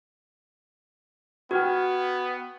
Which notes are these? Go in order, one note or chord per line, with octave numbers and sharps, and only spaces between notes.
B3 F#4 G5 F6 G#6